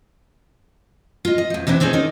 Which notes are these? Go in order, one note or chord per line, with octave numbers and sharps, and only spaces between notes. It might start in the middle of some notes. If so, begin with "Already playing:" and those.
F4 D#5
D#5
E2 F3
C3 E3 D4 E4
D#3 C4 C#4 D#4 G#4
D#4 A#4 D5